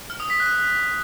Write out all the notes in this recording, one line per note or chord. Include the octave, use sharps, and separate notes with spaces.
F6
D#6
B6
F#6